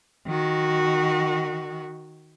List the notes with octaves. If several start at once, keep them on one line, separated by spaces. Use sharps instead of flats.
D#3 F#4